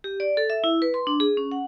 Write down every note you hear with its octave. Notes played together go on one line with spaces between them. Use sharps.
G4
D5
A4
E5
E4
B4
C6
D4
G#4
C#4
F#5